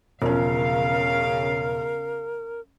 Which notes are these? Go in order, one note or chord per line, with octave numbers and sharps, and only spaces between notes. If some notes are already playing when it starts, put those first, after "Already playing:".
E1 C#3 F3 C#4 A#4 F5